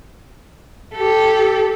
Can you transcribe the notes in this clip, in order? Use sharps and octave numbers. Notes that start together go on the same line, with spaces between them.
G4 A4